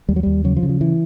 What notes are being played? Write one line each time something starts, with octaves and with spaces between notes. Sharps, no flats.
D#2 G3
F#3
D#2 G3
C#3 F#3
F3
C#3
F3
E3